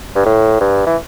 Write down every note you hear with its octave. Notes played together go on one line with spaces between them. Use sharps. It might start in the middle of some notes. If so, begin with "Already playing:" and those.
G2
A2
G2
E3